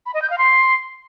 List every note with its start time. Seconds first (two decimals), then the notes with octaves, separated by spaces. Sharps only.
0.06 B5
0.14 D#5
0.22 G6
0.30 F5
0.38 C6